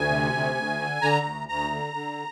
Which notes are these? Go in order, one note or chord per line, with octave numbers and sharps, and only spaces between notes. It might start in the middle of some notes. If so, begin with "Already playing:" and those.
Already playing: D2 G#5
C3
D2
D2
D3
D3 A#5
D2
D2 A#5
D3
D3